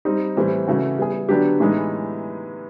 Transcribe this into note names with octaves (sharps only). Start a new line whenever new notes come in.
G3 C4 D#4
A2 E3 G3 C4
C#3 E3 A3 C#4 F#4
G3 B3 E4 G#4
D3 F#3 B3 D4 G4
A2 E3 G#3 B3 D#4